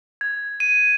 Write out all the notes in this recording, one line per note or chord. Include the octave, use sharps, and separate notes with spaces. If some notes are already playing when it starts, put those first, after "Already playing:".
G#6
D#7